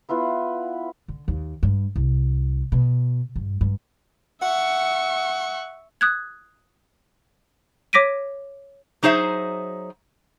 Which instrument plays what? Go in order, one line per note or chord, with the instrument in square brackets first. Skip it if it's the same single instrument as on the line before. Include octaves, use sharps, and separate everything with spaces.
[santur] B3 E4 F4 B4
[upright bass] D3
D#2
G2
C2
B2
G2
G2
[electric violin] E5 C#6 [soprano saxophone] F#5
[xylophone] D#6 F#6 G#6
C#5 D6 A#6 B6 D7 D#7
[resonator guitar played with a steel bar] F#3 D#4 G#4 C5 E5